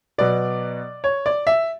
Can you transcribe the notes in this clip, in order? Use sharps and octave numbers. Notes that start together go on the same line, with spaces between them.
B2 F#3 B3 D5
C#5
D5
E5